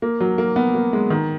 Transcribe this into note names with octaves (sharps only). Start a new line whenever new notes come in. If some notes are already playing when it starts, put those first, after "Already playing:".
A#3
F#3
A#3
B3
A#3
G#3
D#3